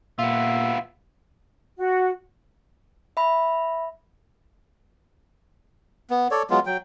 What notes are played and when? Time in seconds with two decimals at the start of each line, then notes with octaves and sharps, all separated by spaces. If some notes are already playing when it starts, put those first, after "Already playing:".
0.19 A#2 B3 F4 E5
1.77 F#4
3.17 E5 B5
6.10 B3
6.31 A4 C#5 D5
6.50 F#3 G#3 B3 F4
6.66 F#3 G5